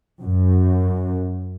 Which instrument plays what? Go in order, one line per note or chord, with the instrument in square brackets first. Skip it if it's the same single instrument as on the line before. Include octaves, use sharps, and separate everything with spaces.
[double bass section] F#2